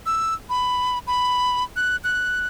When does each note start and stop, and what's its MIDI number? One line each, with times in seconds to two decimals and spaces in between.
0.06 0.34 88
0.49 0.99 83
1.07 1.63 83
1.76 1.97 90
2.04 2.47 90